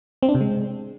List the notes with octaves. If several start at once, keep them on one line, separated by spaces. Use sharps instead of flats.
C4
D4
C3
G#3